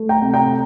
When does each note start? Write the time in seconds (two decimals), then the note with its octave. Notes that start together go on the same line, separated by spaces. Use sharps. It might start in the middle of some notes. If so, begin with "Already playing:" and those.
Already playing: A3
0.09 G5 A#5
0.22 C3
0.34 G5 A#5